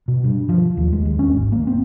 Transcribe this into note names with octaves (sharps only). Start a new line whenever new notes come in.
B2
G2
F3
D#2
G#3
D#2
C#4
G#1
A#3
C4